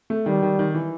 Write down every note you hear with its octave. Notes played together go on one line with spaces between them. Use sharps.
A3
D#3 G3
D#3
D#3
E3